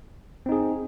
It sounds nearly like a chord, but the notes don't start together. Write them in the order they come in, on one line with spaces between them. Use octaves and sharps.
C4 D#4 G#4